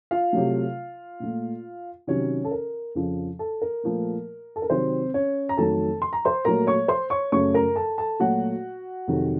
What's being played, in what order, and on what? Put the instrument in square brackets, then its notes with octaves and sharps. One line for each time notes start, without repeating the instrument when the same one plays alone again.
[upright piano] F4 F5
C3 F#3 A3
A#2 A3
C3 D#3 F#3 C#4 C#5
A4
A#4
F2 C#3 F3
A4
A#4
A#2 F3 A3
A4
A#4
C3 D#3 F#3 C4 C5
C#4 C#5
A#5
F2 D#3 F#3 A3 A4 A5
C6
A#5
C5 C6
A#2 F#3 A3 A#4 A#5
C#5 C#6
C5 C6
C#5 C#6
F#2 C#3 A3 C#5 C#6
A#4 A#5
A4 A5
A4 A5
A#2 F#3 A3 F#4 F#5
F2 C3 D#3 F#3